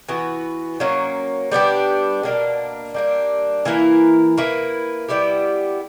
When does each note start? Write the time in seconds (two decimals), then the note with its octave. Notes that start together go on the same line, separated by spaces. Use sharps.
0.09 E3 B3 F#4 B4
0.80 F#3 A#3 C#4
1.52 G3 B3 D4 G4
2.23 B2 A#3 D4 A#4
2.94 G3 A#3 D4
3.65 E3 A#3 E4 A#4
4.38 A#3 E4 B4
5.09 G3 B3 E4 G4